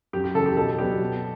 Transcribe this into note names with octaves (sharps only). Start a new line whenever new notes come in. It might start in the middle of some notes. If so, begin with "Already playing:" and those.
F#2 G4
G4
C#3 E3 A4
G4
B2 A4
F#3 B3 D4 G4
B2